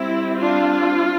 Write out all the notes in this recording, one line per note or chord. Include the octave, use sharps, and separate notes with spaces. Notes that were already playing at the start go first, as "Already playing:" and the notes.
Already playing: G3 C4 E4
D4 F4